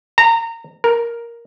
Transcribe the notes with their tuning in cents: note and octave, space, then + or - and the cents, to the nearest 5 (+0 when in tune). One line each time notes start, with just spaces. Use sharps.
A#5 -25
A#4 +5